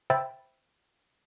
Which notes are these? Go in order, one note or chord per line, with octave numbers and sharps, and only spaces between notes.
C5 E5 G5 B5 E6 A6